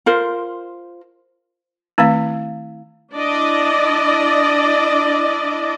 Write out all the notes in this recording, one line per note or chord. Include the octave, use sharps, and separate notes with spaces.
F4 A#4 C5
D#3 A3 C4 E4 F5
D4 E4 D5 D#5